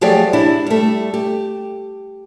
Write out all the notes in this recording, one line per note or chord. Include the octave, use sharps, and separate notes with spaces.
F3 F#3 A3 G4 G#4 D5
D4 E4 G4
G3 A3
G4